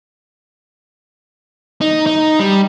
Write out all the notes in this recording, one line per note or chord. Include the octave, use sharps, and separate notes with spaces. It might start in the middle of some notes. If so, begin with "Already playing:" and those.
D#4
D#4
G3